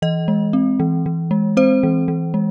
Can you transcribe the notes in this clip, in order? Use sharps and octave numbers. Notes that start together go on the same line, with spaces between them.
E3 D#5
G#3
C4
E3
E3
G#3
C4 C5
E3
E3
G#3